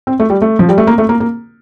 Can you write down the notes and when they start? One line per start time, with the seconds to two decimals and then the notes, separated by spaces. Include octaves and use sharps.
0.07 C4
0.20 A3
0.30 G3
0.42 A3
0.59 F3
0.69 G3
0.78 A3
0.87 A#3
0.98 A3
1.09 A#3
1.20 A#3